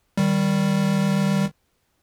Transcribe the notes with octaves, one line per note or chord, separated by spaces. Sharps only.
D#3 G3